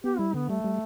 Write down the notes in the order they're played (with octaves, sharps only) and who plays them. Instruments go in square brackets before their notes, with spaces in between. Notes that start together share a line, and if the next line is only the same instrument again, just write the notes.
[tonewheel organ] B3 [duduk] G4
[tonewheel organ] G3 [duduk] E4
[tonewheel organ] D3 [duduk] B3
[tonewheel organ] G3 [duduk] A3
[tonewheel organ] G3